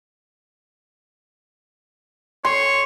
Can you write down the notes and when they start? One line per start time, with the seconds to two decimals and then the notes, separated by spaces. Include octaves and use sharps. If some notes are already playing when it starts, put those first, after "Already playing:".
2.45 C#5 C6